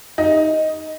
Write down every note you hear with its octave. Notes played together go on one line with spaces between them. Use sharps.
D#4